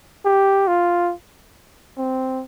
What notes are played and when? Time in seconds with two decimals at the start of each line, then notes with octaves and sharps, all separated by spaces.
0.25 G4
0.67 F4
1.98 C4